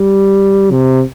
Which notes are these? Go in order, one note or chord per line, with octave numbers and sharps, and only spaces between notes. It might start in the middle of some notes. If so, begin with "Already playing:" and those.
Already playing: G3
C3